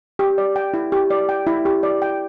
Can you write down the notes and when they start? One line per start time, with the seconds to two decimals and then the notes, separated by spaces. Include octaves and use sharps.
0.19 G4
0.38 D5
0.56 G5
0.74 E4
0.92 G4
1.10 D5
1.29 G5
1.47 E4
1.65 G4
1.83 D5
2.02 G5